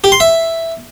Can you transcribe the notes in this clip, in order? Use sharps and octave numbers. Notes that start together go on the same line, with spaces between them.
G4
C6
E5